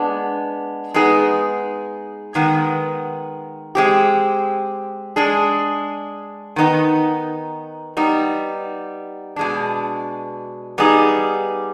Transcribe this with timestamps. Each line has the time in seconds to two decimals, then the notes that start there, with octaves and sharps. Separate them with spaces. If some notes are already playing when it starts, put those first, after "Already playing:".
Already playing: G#3 B3 D4
0.94 G#3 B3 D#4 G#4
2.35 D#3 G#3 B3
3.75 G#3 C4 G4
5.16 G#3 D4 G#4
6.56 D#3 B3 D#4
7.97 G3 B3 D#4
9.36 B2 G#3 D4
10.78 G3 B3 D#4 G#4